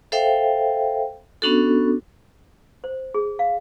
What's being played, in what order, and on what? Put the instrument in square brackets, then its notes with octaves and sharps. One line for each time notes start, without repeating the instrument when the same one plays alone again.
[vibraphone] A4 C5 E5 F5 G5
B3 C#4 D4 F#4 A4
[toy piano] C5
G#4
F5